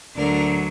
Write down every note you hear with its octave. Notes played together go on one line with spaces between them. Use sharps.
D2 D3 F#3 D4 A#4 D5